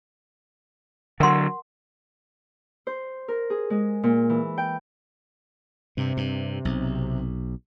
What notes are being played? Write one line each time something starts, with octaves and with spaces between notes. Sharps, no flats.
D3 F#3 A#4 F#5 C6
C5
A#4
G#4
G#3
A#2
E3
G5
G2 C3
G2
B1